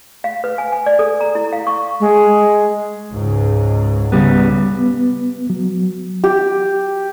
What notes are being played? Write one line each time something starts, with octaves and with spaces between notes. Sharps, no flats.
F5
B4
G#5
G#5
D5
A4
A#5
E4
F5
C#6
G#3
C#2 G#2
C#3 G3 B3
B3
F#3
G4